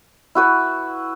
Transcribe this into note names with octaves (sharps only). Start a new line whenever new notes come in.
E4 F#4 B4